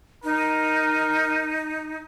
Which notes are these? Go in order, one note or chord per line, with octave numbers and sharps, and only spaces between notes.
D#4 A#4